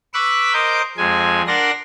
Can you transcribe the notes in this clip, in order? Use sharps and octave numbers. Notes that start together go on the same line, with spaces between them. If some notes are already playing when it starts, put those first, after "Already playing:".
B4 B5 C#6 D6 E6 F#6
A#4 C5 D#5 D6 G6
F2 G#3 G#5
D4 A#4 D5 F#5 C6 A#6